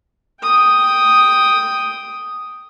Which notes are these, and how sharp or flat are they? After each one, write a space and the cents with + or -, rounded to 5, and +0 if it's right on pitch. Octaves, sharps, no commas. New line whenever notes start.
G5 +0 D#6 +0